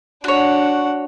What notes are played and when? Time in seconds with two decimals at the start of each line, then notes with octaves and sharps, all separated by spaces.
0.24 D4 F#4 C#5 F#5